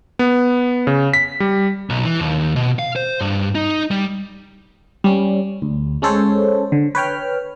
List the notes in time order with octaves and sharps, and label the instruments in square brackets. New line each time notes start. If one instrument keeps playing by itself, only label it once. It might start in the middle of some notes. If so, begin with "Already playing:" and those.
[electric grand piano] B3
C#3
B6
G3
[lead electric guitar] B1
E3
D#2
B2
F5
C5
G2
D#4
G3
[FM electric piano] G3 C#4
D2
G#3 C#4 A4 C5 C#5
D3
B4 C#5 G5 F6